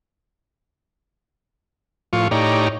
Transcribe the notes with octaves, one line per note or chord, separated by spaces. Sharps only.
A2 F3 F4 C#6
A2 D#4 G4 C#5 D5 A#5